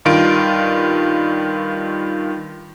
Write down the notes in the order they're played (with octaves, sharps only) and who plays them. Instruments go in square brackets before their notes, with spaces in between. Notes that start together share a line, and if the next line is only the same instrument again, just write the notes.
[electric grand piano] G2 D#3 F4 D7